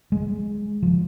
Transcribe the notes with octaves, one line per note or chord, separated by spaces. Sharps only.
G#3
F3